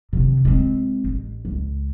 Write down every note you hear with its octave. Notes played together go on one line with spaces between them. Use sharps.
C3 D#3
G#3 C4
A1
C#2